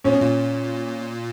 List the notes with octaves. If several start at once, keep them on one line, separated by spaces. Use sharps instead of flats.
A#2 C#4
B2
A#2